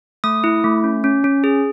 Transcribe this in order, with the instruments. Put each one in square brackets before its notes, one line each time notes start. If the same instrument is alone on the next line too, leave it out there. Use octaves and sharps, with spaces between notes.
[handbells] A3 D#6
E4
A3
C#4
C#4
C#4
G#4